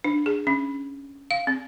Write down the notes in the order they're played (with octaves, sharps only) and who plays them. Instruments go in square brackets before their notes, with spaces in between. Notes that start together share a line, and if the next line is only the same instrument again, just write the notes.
[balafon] D4
G#4
C#4
F5
C4